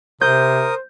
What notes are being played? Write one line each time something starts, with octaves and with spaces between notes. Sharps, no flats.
C3 A#4 C5 D#6 G6